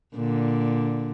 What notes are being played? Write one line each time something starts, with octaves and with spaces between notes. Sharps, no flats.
A#2 D3